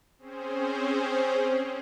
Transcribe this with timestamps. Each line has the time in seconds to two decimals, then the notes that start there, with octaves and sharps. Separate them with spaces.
0.18 C4 C#4 G#4 C5